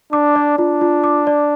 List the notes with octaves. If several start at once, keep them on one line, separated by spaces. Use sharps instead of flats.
D4 D6
D5
D4 F4
F4
D6
D5